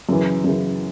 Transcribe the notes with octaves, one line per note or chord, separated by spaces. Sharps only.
F#2 C#3 E3
F#2 C#3 E3